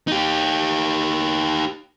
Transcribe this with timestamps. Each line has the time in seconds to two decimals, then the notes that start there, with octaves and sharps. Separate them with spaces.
0.07 D#4 G4